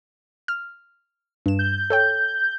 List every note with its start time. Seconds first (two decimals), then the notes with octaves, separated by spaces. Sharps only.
0.48 F6
1.46 G2 E7
1.59 G6
1.90 A4 C#5 G5